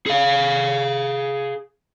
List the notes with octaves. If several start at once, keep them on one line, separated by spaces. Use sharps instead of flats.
G#4 F5